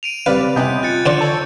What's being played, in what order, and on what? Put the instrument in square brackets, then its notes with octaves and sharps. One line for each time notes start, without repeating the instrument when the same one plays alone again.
[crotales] D7 D#7 F7
[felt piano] C#3 G3 C4 [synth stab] B4 D5 [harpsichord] F5
[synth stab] C3 B3 [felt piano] C#4 D#5 G#5 [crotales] G6
[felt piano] F4 [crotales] F#6 A6 C#7
[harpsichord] D3 C5 D5
[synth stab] A4 C#5